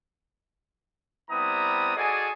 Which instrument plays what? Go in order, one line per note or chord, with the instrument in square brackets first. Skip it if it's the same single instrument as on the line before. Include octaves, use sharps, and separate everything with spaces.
[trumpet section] G3 B3 C4 E4 A#5 D#6
F#4 G#4 A4 D5 D#5 G#5